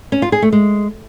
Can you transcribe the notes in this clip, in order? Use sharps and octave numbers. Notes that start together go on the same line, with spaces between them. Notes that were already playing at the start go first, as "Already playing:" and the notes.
C#4
F4
G#4
A3
G#3